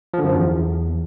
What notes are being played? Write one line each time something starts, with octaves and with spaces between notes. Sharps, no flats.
F3
D3
F#2
F3
E2